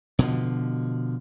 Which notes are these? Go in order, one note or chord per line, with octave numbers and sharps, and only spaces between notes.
B2 D3 F3